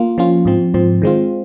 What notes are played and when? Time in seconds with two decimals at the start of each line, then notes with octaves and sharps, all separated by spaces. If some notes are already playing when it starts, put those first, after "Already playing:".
Already playing: A#3 F4
0.18 F3 A#3 C#4 F4
0.45 G#2 F3 C4
0.74 G#2 F3 C4
1.02 D#3 G#3 C4 F4